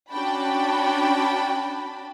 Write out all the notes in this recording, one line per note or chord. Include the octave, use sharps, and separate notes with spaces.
C#4 D4 F#4 G5 A5 B5